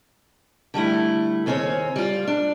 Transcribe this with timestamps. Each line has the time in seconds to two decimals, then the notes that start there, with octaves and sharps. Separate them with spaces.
0.74 D3 G3 A3 E4
1.46 D#2 C#3 C4 C#4 C#5
1.96 G3 F4
2.27 D4